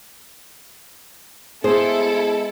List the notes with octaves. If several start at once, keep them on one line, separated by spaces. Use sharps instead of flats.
G#3 B3 E4 G#4 A4 C5